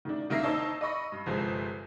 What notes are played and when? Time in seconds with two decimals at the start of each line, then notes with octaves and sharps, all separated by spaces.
0.05 D#3 A3 D4
0.29 A1 D#3 A#3 E5 A#6 C7
0.43 C4 D#4 C#5 A5 E6 C7
0.81 D#5 B5 C#6 A#6
1.12 G2
1.26 G1 C3 F3 G#3 C5